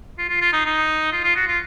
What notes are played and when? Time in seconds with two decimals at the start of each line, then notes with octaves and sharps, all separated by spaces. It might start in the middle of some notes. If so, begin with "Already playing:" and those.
0.18 F4
0.29 F4
0.41 F4
0.52 D#4
0.66 D#4
1.13 F4
1.24 F4
1.36 F#4
1.47 F4